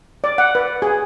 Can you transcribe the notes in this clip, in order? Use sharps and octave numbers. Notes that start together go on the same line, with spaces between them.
D5
F#5
B4
G#4